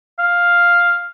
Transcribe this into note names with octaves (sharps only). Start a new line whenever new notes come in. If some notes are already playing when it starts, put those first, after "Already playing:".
F5